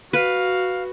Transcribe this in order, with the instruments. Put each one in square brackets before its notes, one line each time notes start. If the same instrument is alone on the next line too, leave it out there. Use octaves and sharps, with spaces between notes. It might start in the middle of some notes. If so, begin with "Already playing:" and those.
[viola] F#4 [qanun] B4 [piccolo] F5